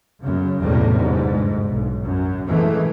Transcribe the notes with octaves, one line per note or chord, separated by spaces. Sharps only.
F#2 C#3
B1 E2 A2 C3 F#3 G3
G1 G#2
B1
F#2
F#2 E3 G#3 A3